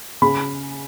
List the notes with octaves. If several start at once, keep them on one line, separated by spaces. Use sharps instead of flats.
C#3 B5